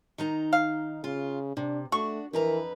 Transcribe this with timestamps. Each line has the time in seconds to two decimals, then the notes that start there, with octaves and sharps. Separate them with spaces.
0.18 D#3 D#4 A#5
0.53 F5
1.04 C#3 F4
1.57 C3 D4
1.92 A3 D4 F#4 C#6
2.33 F2 E3 A#4 B4 A#5